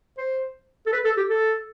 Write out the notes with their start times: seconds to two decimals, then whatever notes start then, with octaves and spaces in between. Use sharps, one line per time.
0.18 C5
0.86 A4
0.92 B4
1.04 A4
1.17 G4
1.29 A4